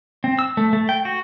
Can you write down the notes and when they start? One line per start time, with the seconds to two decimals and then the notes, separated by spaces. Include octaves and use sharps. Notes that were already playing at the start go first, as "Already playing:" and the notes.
0.24 C4
0.39 E6
0.57 A3
0.73 A3
0.89 G5
1.05 F#4